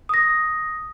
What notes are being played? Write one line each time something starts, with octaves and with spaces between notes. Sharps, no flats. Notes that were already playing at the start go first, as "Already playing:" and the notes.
D#6 A#6